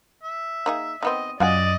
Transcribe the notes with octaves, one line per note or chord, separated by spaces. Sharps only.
E5
A#3 D#4 G#4
D#3 B3 C4 D#5
F#2 F4 D5 D#5 F#5 G#5